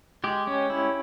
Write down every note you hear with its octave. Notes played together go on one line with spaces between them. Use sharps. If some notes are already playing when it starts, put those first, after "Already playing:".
G#3 G4
C#4
E4